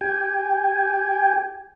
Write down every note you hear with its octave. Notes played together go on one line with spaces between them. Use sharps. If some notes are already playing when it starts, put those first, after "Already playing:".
G4 G5 G#5